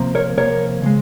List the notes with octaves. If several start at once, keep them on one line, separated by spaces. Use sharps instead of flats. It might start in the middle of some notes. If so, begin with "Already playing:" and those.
Already playing: C3 F3 A#3
A#4 C#5
C3 F3 A#3 A#4 C#5
C#3 F3 G#3